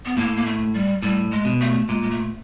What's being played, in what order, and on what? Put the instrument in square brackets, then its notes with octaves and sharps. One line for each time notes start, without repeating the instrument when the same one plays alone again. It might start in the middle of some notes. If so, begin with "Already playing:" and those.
[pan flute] B3
[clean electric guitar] A2 [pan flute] A#3
[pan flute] A#3
A3
G3
[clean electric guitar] A2 [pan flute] G3
[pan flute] G#3
[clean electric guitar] B2
[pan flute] A3
[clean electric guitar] A#2 [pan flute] G#3
[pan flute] G#3
A3